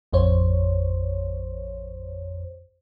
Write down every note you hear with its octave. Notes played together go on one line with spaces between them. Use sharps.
A1 F2 C5 C#5